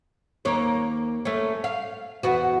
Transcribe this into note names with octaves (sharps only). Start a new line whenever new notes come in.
D#2 A#3 C#5
A3 C#4
F5
E2 B3 F#4